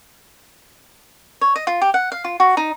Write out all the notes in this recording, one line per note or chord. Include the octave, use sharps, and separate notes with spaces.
C#5
D#5
F4
G4
F#5
F5
F4
F#4
D#4